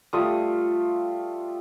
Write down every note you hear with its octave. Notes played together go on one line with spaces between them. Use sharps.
G3 A3 F4 D#6